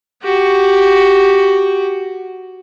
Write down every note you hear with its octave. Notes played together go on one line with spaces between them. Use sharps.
F#4 G4